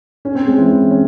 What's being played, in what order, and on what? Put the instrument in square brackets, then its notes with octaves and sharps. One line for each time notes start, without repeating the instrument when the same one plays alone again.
[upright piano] C#4
C4
G#3
E3
E3
C#4